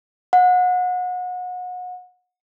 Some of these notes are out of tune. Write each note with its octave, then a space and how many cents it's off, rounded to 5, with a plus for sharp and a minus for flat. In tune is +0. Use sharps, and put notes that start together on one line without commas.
F#5 -30